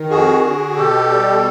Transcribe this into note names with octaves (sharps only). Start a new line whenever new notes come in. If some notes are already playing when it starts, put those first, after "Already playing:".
Already playing: D#3
F2 F#4 G#4
D3
B2 G4 A4
G3